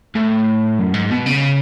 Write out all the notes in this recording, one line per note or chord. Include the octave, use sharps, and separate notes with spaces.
A2
F#2
G#2
B2
C#3